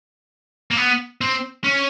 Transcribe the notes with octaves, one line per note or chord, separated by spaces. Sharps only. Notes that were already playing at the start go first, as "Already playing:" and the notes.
A#3
B3
C4
C#4